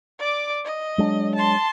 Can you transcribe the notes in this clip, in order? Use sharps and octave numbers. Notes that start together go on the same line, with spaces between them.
D5 D6
D#5
F#3 G#3 D4
A5 C6